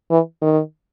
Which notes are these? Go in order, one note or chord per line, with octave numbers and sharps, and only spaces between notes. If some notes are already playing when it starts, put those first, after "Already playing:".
E3
D#3